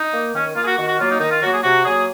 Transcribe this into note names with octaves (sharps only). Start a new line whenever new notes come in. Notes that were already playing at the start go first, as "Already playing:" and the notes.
Already playing: D#4
A#3
D#3 C#4
A#3 F4
G#4
F#4
D#3 F#4
F#4
F#3 A#3 F4
D#4
D#3 D#4
F4
F#3 A#3 F#4
G#4
C3 F#4
F#3 A#3 G#4